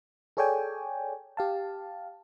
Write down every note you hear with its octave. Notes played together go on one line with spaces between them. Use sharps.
G#4 A4 C#5 D5 G5 G#5
G4 F5 A5